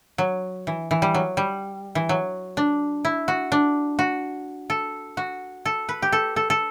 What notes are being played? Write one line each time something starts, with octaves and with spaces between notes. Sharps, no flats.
F#3
E3
E3
G3
F#3
G3
E3
F#3
D4
E4
F#4
D4
F#4
A4
F#4
A4
B4
G4
A4
A4
A4